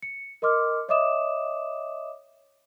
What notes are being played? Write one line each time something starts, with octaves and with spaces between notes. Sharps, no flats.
C#7
A#4 D#5 C6 D6 F6
C#5 D#5 E5 D6 D#6 E7